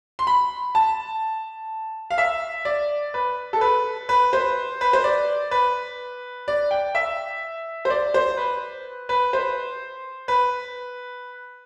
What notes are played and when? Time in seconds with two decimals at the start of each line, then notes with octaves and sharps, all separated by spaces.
0.19 C6
0.27 B5
0.75 A5
2.11 F5
2.18 E5
2.65 D5
3.14 B4
3.53 A4
3.61 B4
4.09 B4
4.33 C5
4.81 B4
4.93 C5
5.04 D5
5.51 B4
6.48 D5
6.71 G5
6.95 E5
7.85 C5
7.90 D5
8.14 C5
8.37 B4
9.09 B4
9.33 C5
10.28 B4